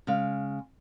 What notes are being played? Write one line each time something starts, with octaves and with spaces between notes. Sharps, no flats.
C#3 G#3 F5